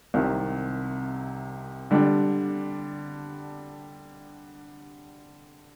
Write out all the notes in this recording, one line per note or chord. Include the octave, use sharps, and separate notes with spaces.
C2 C3 D#3
D3 G3 D4